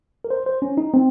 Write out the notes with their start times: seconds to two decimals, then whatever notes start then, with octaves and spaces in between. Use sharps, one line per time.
0.24 A#4
0.30 C5
0.46 C5
0.62 C#4
0.77 D#4
0.94 C4